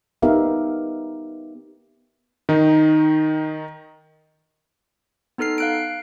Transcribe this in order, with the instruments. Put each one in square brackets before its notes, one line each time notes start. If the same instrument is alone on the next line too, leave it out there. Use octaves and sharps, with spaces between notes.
[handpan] B3 D#4 G4 A#4 E5 F5
[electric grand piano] D#3 D#4
[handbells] B3 D#4 A4 F6 C7
F5 F#6 D7